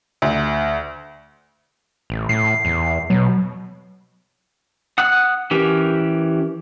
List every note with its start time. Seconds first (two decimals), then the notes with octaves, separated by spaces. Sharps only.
0.22 D2
2.10 A1
2.29 A2 C7
2.65 E2
3.10 B2 F#3
4.98 F#5 D#6 F#6
5.51 E3 C#4 G4 A#4